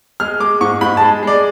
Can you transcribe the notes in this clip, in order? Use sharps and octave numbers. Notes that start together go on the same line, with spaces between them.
G#3 F6
G#3 D6
G#2 C#6
G#2 B5
G#3 A5
G#3 D5